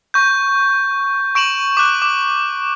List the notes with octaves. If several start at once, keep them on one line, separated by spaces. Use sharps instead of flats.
C#6 G6
C#6 D7 E7 F#7
D6 F#6
D6